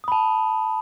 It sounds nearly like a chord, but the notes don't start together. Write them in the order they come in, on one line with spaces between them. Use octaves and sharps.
D#6 B5 A5